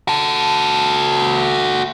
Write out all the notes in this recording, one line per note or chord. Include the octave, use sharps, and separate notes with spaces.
F#4 A4